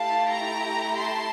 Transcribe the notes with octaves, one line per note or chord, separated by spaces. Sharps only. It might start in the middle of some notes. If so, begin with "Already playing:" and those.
Already playing: A3 E4 G4 F5 A5
G5 A#5
A5 C6